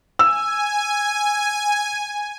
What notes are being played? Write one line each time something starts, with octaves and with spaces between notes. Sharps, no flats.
G#5 E6